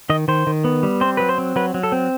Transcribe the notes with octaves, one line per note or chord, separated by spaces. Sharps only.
D#3 D#5
D#3 C5
D#3
B3
G3
C4 C5
F#3 B4
C5
C4
F#3 B4
F#3
A4
C4